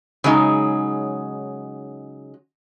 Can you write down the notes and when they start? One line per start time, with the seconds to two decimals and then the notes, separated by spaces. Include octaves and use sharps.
0.24 C#3 F#3 G#3 D#4